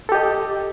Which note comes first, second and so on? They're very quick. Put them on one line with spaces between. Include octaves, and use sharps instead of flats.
A4 G4 D#5